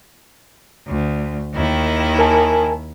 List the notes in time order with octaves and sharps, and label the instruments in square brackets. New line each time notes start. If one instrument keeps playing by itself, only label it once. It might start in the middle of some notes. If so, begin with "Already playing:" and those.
[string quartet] D2
D#2 D#3 E4
[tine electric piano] A#4 G#5 A5